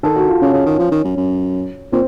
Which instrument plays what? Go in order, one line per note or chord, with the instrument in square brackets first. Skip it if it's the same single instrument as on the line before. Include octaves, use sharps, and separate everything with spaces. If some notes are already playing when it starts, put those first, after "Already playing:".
[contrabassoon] D#3 [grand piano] A4
[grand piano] F#4
F4
[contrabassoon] C#3 [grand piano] C#4
[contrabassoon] C#3
D#3
F3
D#3
F#2
F#2
[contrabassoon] A#2 [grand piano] C4